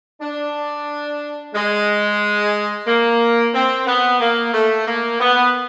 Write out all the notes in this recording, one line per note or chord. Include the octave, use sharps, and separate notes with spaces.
D4
G#3
A#3
C4
B3
A#3
A3
A#3
B3